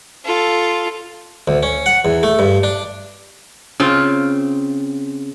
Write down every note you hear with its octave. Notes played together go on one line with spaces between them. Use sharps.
F4 A4
D2
C#4
F#5
E2
A3
G2
D4
C#3 C4 F4